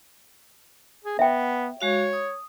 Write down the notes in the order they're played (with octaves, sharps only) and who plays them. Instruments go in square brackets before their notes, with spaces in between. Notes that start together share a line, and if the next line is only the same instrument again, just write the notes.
[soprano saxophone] G#4
[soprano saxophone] B3 [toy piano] E5 G5
[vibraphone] G#3 F#4 F5 [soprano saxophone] C#5
[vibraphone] D#6